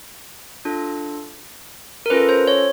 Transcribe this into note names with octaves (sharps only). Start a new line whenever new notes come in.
D4 F4 A4
A#4
C#4 F4 A4 B4
C5
C#5